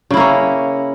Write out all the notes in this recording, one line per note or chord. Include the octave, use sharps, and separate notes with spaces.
C#3 A#3 C#4 E4